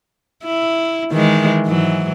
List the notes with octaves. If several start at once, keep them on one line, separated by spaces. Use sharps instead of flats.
E4
D#3 E3 G#3
G#2 E3 F#3